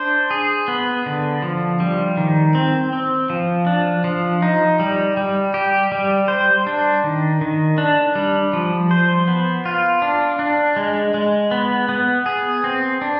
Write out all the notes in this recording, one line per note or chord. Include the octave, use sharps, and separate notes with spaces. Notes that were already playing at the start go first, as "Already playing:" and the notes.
Already playing: D4 C5
G#4
B3
D3
F3
G3
D#3
C4
C4
F3
D4
F3
D#4
G3
G3
G4
G3
C5
D4
D#3
D#3
D4
G3
F3
C5
B3
F4
D4
D4
G#3
G#3
B3
B3
G#4
C4
D4